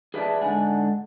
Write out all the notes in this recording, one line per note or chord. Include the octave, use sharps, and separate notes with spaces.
G#4 B4 D5 E5 G5 A5
G#2 D3 A4 F#5 G#5